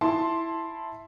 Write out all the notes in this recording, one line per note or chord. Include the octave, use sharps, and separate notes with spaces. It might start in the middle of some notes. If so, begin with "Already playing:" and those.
E4 A5 C6